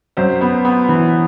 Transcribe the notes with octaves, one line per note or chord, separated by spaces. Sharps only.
F#2 C5
B3
B3
E3